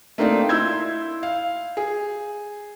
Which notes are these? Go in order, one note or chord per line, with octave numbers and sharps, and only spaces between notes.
A3 A#3 C4 D4 D#4
E4 C6 E6 G6 G#6
F5
G#4